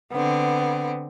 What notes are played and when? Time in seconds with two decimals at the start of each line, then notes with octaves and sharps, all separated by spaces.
0.12 D3 B3 C4